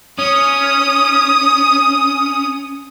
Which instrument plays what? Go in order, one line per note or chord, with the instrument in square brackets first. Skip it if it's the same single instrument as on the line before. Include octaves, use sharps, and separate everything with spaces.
[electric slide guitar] C#4 [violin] D#6